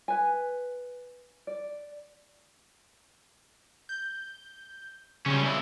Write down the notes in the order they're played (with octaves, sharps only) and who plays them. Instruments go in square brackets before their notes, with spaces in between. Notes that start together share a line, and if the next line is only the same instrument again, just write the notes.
[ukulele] B4 G#5
D5
[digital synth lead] G6
[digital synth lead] C#3 [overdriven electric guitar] G3 C#4
[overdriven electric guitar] C#2 E4